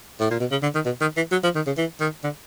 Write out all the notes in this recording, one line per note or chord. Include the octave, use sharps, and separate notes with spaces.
A2
A#2
B2
C#3
D3
D#3
B2
D#3
E3
F#3
F3
D#3
C#3
E3
D#3
D3